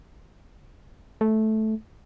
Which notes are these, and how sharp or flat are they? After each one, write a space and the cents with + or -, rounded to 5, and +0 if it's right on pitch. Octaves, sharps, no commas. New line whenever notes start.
A3 -10